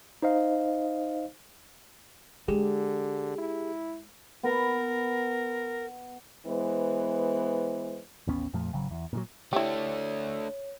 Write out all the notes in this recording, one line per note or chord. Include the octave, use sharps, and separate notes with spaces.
D#4 C5 D#5 F5
D3 G#3 G4 G#4
E4
B3 A#4
E3 G#3 B3 C5
A1 D#2 B3 C#4
F2 A#2 F3 A3
G#1 C#3 F#3
E2
A#2 D#3 F#3
A3 D4 E4 G4 C#5